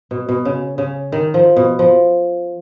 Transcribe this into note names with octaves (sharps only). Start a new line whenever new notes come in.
B2
B2
C#3
C#3
D#3
F3
B2
F3